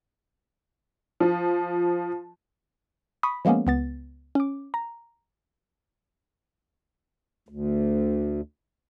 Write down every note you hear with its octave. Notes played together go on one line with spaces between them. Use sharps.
F3
B5 C#6 D#6 B6
F3 G#3 A#3 B3 C#4
C#2 B3 A6
C#4 D6
A#5
D2